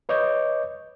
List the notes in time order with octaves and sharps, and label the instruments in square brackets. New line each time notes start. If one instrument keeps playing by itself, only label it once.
[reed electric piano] B4 C#5 D#5 D6 G6